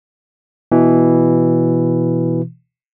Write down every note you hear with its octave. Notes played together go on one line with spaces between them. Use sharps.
B2 E3